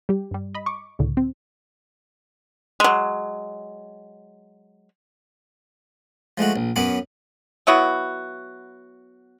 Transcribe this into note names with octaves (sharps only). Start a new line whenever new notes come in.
G3 G4
G2 G3
D#5 B5
C#6 D6
C#2 A2 D3
C4
F#3 G#3
F3 G#3 A3 F#4
A#1
F#2 B3 C#4 B5 D6
F#3 B3 E4 F#4